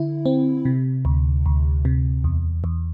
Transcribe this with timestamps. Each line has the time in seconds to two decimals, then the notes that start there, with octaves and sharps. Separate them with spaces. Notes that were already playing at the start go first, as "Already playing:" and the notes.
Already playing: D3 E4
0.26 C4
0.65 C3
1.05 D2
1.46 D2
1.85 C3
2.24 E2
2.64 E2